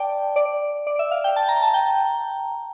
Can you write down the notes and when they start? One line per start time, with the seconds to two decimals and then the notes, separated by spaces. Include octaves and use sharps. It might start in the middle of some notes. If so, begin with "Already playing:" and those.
Already playing: D5 G5 A5
0.36 D5
0.87 D5
0.99 E5
1.11 F5
1.24 G5
1.36 A5
1.48 A#5
1.62 A5
1.74 G5